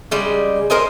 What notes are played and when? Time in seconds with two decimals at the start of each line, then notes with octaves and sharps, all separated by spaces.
0.11 C#3 G3 G#3
0.70 A#4 C5 D#5 G#5